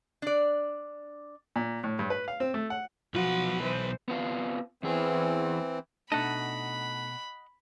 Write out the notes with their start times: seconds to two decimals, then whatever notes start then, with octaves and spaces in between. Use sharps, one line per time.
0.22 D4 D5
1.56 A#2
1.84 A2
1.99 G2
2.10 B4
2.28 F5
2.40 C4
2.54 A3
2.70 F#5
3.14 B1 F3 F#4 B4
3.62 E3 C5
4.08 B3 C4 F4
4.83 E2 E3 C4 G#4
6.12 B2 A3 D4 D#4 D#5 F#5 A5 B5